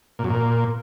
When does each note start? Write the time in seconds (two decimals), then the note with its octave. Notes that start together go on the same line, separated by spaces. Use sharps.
0.19 A#2
0.24 F#2
0.30 A#2